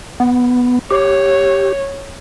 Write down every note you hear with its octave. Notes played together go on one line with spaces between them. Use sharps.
B3
G4 C#5